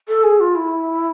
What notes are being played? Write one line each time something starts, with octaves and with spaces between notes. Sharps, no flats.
A4
G#4
F4
E4